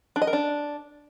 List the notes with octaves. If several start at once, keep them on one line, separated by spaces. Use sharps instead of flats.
D4
D#5
A#4
D4